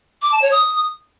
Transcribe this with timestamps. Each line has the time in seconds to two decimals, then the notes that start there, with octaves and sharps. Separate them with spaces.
0.22 D6
0.32 A5
0.42 C#5
0.52 D#6